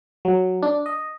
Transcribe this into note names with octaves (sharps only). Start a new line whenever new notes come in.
F#3
D4
D#5